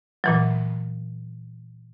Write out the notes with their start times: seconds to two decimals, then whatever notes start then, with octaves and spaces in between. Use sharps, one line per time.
0.24 A#2 E3 F#3